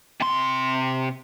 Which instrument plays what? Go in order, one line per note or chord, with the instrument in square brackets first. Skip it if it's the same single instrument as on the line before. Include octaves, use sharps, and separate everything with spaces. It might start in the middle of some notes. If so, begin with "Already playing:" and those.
[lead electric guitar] C3 C6